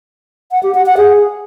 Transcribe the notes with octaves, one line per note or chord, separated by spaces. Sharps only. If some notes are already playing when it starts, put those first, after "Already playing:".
F#5
G4
F#5
F#5
G#4